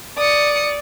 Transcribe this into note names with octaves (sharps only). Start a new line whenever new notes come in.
D5 D#6 C#7